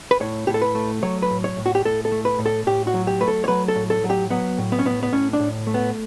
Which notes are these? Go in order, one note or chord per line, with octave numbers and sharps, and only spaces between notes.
B4
A2 C#5
A2 G4
A4
B4
A3
F#3 C#5
B4
A2
C#5
A2
F#4
G4
A2 A4
A4
A3
B4
A2
A4
A2 G4
F#4
F#3
G4
A3 B4
A4
C#5
F#3 B4
A4
A2
A4
F#3
G4
F#3 B3
A2
B3
C#4
A2 B3
B3
A2 C#4
D4
A2
A3
B3